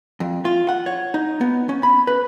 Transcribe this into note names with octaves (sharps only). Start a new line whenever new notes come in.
F2
F4
F#5
C#5
D#4
B3
C#4
B5
B4